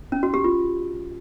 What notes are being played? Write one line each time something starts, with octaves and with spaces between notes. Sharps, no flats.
C#4
F#4
G4
F4